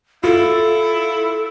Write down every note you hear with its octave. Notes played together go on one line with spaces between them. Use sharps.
E4 F4 A4